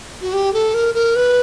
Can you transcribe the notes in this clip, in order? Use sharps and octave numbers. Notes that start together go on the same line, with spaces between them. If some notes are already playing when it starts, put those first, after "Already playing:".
F#4
G4
A4
A#4
A#4
B4